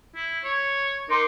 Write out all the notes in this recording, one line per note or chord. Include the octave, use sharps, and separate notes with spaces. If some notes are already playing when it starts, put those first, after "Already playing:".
E4
C#5
D#4 A#4 C6 D6